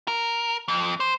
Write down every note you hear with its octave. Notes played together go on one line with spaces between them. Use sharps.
A#4
F2
C5